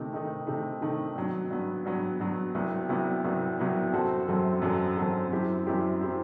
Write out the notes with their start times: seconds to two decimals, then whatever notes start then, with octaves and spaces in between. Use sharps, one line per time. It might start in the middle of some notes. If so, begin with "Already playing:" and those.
Already playing: C3 D#3 A3 D#4
0.13 C3 D#3 A3 D#4
0.47 C3 D#3 A3 D#4
0.81 C3 D#3 A3 D#4
1.15 G2 F#3 B3
1.50 G2 F#3 B3
1.85 G2 F#3 B3
2.20 G2 F#3 B3
2.55 C2 C3 F#3 B3
2.89 C2 C3 F#3 B3
3.24 C2 C3 F#3 B3
3.59 C2 C3 F#3 B3
3.93 F#2 F#3 C4 F#4 A4
4.28 F#2 F#3 C4 F#4 A4
4.62 F#2 F#3 C4 F#4 A4
4.97 F#2 F#3 C4 F#4 A4
5.32 F#2 F#3 C4 E4 G4
5.67 F#2 F#3 C4 E4 G4
6.01 F#3 C4 E4 G4